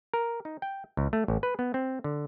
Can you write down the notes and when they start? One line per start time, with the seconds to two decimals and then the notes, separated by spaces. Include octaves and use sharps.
0.14 A#4
0.45 D#4
0.62 G5
0.97 C#2
1.13 A3
1.28 A1
1.43 B4
1.59 B3
1.74 C4
2.04 D3